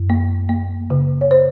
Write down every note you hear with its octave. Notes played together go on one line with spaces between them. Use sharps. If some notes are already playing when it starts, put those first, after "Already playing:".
Already playing: F#2
A#3
A#3
C#3
C#5
C5